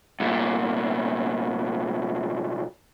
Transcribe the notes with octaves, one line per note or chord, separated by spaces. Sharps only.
C2 A#2